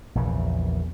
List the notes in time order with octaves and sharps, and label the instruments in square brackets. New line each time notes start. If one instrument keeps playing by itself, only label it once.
[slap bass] A#1 E2 C#3